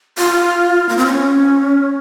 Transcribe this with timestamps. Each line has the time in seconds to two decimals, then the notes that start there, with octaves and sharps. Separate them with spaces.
0.18 F4
0.89 A#3
0.97 C4
1.06 C#4